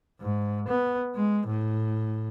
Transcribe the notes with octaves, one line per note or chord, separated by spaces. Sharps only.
G#2
B3
G#3
A2